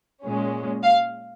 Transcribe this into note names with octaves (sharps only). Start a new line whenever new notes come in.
A#2 G#3 C#4
F5